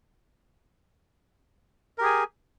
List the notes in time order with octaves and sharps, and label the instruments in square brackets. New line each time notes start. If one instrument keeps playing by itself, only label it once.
[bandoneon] A#4
G4
G#4
G#5